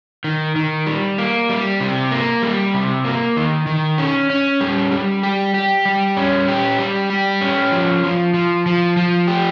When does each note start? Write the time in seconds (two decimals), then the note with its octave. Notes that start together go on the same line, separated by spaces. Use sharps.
0.24 D#3
0.56 D#3
0.86 G3
1.18 A#3
1.49 G3
1.80 C3
2.11 A#3
2.42 G3
2.74 C3
3.05 A#3
3.37 D#3
3.67 D#3
3.98 C#4
4.30 C#4
4.61 G3
4.91 G3
5.23 G4
5.54 G4
5.85 G3
6.17 C#4
6.48 G4
6.79 G3
7.10 G4
7.41 C#4
7.72 F3
8.04 F3
8.34 F3
8.66 F3
8.97 F3
9.28 G4